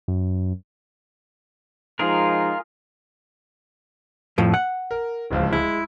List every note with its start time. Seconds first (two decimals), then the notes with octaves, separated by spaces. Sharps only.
0.08 F#2
1.99 F3 G#3 D#4 F4 G#4 A#4
4.38 F2 A2 F3
4.54 F#5
4.91 A#4
5.31 D1 C#2 F3
5.53 G#3 E4